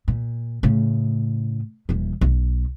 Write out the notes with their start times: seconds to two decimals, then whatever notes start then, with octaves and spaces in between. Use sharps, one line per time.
0.08 A#2
0.63 A2 C#3
1.89 D#1 E3
2.21 B1